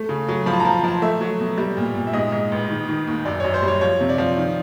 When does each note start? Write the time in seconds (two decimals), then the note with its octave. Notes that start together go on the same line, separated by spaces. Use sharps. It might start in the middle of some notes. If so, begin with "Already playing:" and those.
Already playing: A3
0.09 C#3
0.28 F#3
0.46 F3 B5
0.53 A5
0.60 F3 A#5
0.84 F3 A5
1.02 A3 E5
1.21 F#3
1.40 B2
1.58 G3
1.77 A#2
1.95 A#2
2.07 E5
2.13 G#2 D#5
2.32 G#2
2.52 A1
2.70 D#3
2.88 D#3
3.07 D#2
3.25 F#2 D5
3.40 F#2 C#5
3.54 C5
3.63 G3
3.68 C#5
3.81 F3 C#5
4.01 C3
4.09 D5
4.18 F3
4.37 D#3